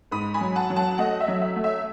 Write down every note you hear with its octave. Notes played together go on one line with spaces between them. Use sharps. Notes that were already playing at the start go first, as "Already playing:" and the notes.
G#2 B5 D#6
G#5 B5
F#3
F#5 A5
F#3
F#5 A5
A3 D#5 F#5
E5
F#3
E5
A3
E5